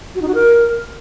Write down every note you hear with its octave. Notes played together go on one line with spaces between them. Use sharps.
F#4
D#4
F#4
A#4